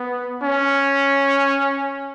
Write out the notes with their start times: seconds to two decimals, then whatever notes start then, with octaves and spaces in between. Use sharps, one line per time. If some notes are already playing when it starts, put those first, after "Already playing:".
Already playing: B3
0.43 C#4